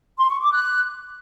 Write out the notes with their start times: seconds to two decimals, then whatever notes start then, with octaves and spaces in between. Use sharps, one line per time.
0.18 C6
0.29 C#6
0.41 D6
0.52 F#6